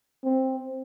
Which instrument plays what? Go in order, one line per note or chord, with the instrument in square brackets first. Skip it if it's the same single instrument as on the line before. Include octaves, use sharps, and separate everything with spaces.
[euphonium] C4